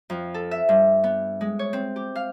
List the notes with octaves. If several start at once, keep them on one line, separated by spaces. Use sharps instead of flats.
F2
A4
E5
G2
B3
G#3
C#5
C4
G4
F5